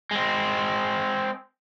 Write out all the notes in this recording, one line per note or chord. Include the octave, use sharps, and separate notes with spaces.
G#3 C4